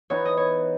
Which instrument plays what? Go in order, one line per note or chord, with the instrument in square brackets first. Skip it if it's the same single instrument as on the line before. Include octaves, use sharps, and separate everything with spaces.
[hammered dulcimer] E3 B3 D#4 [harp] C#5
[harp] D#5
C#5